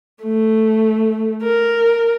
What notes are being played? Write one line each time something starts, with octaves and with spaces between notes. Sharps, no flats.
A3
A#4